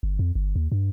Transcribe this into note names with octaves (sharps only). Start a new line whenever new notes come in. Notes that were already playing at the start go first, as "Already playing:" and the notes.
G1
F2
G1
D#2
G2